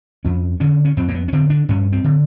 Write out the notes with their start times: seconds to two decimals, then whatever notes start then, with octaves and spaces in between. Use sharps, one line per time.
0.25 F2 C#4
0.60 D3 C#4
0.85 C#4
0.97 F2 C4
1.08 A#3
1.14 B3
1.28 C#4
1.33 D3 C4
1.50 D4
1.69 G2 C#4
1.92 C4
2.04 D3